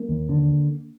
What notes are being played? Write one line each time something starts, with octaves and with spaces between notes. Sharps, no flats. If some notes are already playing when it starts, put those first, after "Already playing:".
Already playing: A#3
D#2
D3